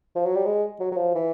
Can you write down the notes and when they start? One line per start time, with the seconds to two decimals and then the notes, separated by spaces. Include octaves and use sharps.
0.15 F3
0.26 F#3
0.35 G3
0.46 G#3
0.80 F#3
0.92 F#3
0.97 F3
1.15 E3